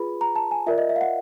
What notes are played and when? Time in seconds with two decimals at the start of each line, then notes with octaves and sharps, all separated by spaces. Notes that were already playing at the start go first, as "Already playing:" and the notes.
Already playing: F4 G#4 B4 B5
0.21 A#5
0.36 A5
0.51 G#5
0.66 F4 A#4 D5 E5
0.78 D#5
0.89 E5
0.96 F5
1.01 F#5